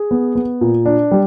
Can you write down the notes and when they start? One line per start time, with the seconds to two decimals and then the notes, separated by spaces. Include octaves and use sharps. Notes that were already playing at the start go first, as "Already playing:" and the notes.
Already playing: G#4
0.11 B3
0.35 B3
0.61 A#2
0.86 D4
1.11 G3